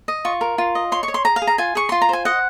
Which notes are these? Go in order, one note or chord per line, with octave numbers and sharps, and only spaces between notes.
D#5
F4 C#6
A#4
F4
D#5
C#5 C6
C#6
C#5
C6
G#4 A#5
F5
G#4
A#5
F4 G#5
G#4 C#6
F4 C6
A#5
C5 G#5
D#5 F#5